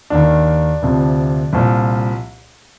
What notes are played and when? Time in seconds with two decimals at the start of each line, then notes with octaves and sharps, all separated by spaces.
0.10 D#2 D#3 D4
0.82 D2 C3 F3
1.53 C2 A#2 F3